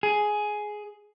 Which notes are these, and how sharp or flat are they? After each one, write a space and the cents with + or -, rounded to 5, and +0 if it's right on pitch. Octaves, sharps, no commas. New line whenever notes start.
G#4 +10